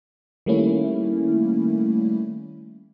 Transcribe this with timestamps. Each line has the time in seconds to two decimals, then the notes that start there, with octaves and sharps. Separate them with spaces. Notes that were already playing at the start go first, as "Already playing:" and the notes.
0.46 D#3 G3 A3 A#3 C#4 E4